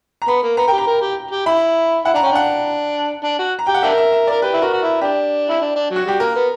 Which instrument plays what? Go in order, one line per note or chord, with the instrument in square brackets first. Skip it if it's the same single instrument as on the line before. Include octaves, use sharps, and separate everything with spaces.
[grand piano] A#5
[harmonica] B3 [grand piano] B5
[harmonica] A#3
[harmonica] B3 [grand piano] A#5
[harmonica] G4 A#4 [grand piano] G5
[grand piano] A#5
[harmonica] A#4
G4
G4
[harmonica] E4 [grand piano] B5
[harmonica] E4 [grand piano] F#5
[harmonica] D4 [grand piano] A#5
[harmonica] C#4 [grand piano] G5
[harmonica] D4 [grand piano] F#5
[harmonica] D4
F#4
[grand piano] A#5
[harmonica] G4 [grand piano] G5
[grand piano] F#5
[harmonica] D4 G4 A#4 [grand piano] E5
[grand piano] E5
E5
[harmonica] A#4 [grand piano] D5
[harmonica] G4 [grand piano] B4
[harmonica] E4
[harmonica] F#4 [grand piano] A#4
[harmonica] F#4
E4
[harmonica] D4 [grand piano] G4
[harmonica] E4
D4
D4
F#3
[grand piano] F#4
[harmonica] G3 [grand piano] G4
[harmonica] A#3 [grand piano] A#4
[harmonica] B3